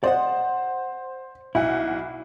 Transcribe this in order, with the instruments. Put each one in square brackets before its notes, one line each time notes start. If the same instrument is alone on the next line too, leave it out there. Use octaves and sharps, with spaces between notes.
[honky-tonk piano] C5 [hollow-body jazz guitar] D5 D#5 F#5
[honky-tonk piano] B1 F#5 [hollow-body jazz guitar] E4